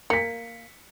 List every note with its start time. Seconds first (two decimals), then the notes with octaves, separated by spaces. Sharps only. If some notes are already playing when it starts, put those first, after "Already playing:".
0.10 A#3 B6 C#7